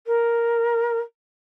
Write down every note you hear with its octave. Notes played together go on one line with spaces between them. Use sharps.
A#4